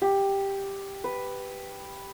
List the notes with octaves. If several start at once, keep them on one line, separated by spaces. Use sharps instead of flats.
G4
B4